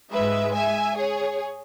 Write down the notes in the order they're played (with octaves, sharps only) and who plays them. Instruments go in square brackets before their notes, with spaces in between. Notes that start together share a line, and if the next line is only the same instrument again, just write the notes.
[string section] G#2 G#3 B4 E5
E5 G#5
G#4 C#5